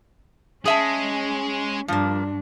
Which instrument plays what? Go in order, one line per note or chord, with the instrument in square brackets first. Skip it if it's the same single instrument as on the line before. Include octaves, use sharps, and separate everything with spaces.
[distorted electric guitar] G#3 [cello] C#4 [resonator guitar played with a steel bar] G#4 E5 A5
[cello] G2 D4 [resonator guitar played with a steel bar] F3 A#3